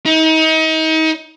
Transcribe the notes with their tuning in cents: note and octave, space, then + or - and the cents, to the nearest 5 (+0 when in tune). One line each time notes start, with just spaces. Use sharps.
D#4 +35